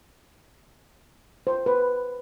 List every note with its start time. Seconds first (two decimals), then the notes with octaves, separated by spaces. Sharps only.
1.47 C5
1.66 B4